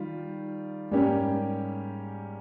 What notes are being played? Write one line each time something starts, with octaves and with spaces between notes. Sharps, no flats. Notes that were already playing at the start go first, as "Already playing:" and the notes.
Already playing: D#3 G3 F4
G#2 G3 A#3 C#4 G4